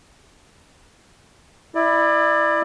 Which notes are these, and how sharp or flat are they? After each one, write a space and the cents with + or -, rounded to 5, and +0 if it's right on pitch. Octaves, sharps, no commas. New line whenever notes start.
E4 +0 D5 +30